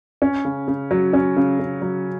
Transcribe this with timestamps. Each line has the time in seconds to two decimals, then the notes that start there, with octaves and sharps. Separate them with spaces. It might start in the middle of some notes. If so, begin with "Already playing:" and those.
0.22 C#4
0.45 C#3
0.68 C#3
0.91 F#3
1.13 C#4
1.36 C#3
1.59 C#3
1.82 F#3